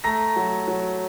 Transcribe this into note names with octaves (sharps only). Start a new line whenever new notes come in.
A3 A#5 A#6
F#3
F#3